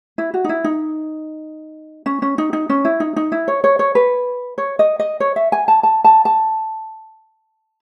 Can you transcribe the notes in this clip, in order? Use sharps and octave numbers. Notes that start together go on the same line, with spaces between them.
E4
F#4
D#4
E4
D#4
C#4
C#4
D#4
D#4
C#4
E4
D#4
D#4
E4
C#5
C#5
C#5
B4
C#5
D#5
D#5
C#5
E5
G#5
A5
A5
A5
A5